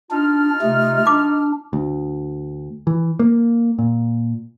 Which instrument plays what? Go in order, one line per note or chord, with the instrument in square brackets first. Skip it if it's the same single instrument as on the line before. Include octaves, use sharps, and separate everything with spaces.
[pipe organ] D4 [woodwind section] D#4 F4 F6
[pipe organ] C3 A3
[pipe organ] D4 [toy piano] D6
[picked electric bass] D2
E3
A#3
A#2